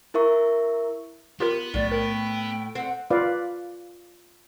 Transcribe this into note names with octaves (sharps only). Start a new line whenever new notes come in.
E4 A#4 E5 C#6
B3 F4 G4 A#4
B1 A2 D5
A#4 G5
C4 F#5
F4 B4 D5 F5